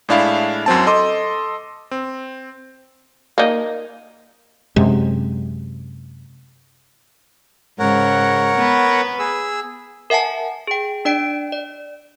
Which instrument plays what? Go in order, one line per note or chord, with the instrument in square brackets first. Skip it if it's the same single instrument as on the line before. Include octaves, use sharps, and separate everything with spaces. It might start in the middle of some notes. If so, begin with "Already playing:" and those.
[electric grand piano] A2 G#3 D4 E4 F5 B5
F#2 F#3 C4 A5
A4 D#5 C6 D6
C4
[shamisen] A#3 D#4
[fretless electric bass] F#2 C3 G#3
[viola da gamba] G#2 C#3 [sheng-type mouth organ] A#4 C#5 F#5
[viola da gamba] B3 B4
[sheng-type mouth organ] G#4 E6
[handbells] A#4 E5 F#5 G#5 A5
G#4 G5
D4 D5 G5 D7
D5